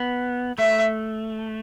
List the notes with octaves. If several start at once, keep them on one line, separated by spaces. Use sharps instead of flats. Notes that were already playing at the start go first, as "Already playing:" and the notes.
Already playing: B3
A3 E5